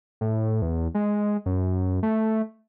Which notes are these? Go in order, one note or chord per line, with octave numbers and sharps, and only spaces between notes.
A2
E2
G#3
F#2
A3